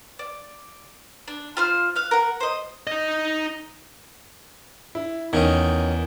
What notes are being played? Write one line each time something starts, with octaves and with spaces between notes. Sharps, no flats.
D5
D4
F4 C5 F6
F5 F#6
A#4 F#5
C5 D#5
D#4 D#5
E4
E2 D#3 C#4 D#4